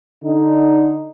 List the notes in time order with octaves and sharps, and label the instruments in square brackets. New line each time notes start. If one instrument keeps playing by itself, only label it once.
[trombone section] D3 D#4